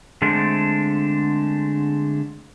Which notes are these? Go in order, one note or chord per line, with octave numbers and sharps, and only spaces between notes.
D3 G#3 A3 C4 D4